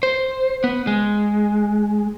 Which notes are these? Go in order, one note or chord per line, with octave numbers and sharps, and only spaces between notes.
C5
B3
G#3